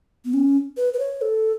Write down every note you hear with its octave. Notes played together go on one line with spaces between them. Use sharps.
B3
C#4
B4
B4
C#5
A4